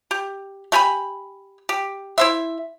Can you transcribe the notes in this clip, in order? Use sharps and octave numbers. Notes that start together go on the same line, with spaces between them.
G4
A3 G4 G#5 B5
G4
E4 C5 E5